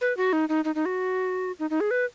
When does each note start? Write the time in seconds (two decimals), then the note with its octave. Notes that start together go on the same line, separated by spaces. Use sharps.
0.01 B4
0.17 F#4
0.33 D#4
0.49 D#4
0.65 D#4
0.75 D#4
0.86 F#4
1.59 D#4
1.70 D#4
1.80 G#4
1.91 B4